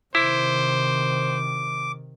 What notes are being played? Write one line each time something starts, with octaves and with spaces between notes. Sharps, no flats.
C3 D#3 E4 C5 D6